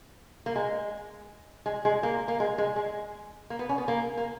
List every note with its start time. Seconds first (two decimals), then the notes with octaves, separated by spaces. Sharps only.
0.46 A#3
0.56 G#3
1.66 G#3
1.85 G#3
2.03 A#3
2.28 A#3
2.40 G#3
2.58 G#3
2.76 G#3
3.50 A#3
3.59 B3
3.69 C#4
3.78 B3
3.88 A#3
4.17 A#3